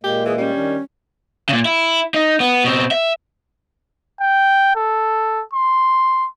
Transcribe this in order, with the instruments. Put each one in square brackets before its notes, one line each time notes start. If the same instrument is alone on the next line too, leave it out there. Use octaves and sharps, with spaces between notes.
[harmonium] A#2 G#3 A#3 [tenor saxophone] G4
[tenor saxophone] E3 [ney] G#4
[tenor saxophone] G3 [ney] C#4
[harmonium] D#3 D4
[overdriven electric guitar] A#2 C#3
E4
D#4
B3
B2 C4
E5
[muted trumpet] G5
A4
C6